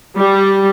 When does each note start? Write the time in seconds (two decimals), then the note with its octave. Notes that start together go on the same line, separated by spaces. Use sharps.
0.17 G3